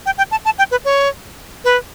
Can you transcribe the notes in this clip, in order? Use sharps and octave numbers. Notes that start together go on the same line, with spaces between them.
G5
G5
A5
A5
G5
B4
C#5
B4